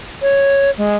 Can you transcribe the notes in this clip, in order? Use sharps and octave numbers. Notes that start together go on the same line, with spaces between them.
C#5
G#3